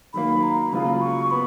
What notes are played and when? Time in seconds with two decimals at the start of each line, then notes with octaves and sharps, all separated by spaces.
0.13 D#3 F#3 A#3 B5
0.43 A#5
0.73 C#3 F#3 A#3 F4 G#4 B5
1.01 C#6
1.31 B3 B5